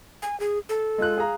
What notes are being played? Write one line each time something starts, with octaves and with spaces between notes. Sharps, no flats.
G#5
G#4
A4
G#3 F4 F#6
G#4 F5 A#5